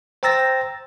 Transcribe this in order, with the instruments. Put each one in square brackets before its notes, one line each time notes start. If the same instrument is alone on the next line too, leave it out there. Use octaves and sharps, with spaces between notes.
[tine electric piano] C5 G5 A#5 E6 A6 A#6